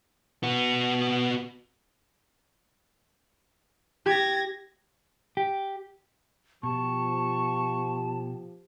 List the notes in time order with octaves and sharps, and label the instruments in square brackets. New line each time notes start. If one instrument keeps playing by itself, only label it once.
[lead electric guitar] B3 F#4
[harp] G4 [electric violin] G#6 A#6
[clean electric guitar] G4
[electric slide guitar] B2 [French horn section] F3 G4 [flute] A5 [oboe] C#6